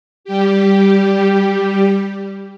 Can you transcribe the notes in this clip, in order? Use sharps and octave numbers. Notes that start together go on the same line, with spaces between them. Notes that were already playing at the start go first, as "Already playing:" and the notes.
G3 G4